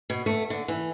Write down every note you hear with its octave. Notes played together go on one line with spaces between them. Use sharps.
B2
A3
D3
E3